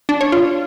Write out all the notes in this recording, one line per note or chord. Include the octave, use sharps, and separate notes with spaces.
D4
C#5
F4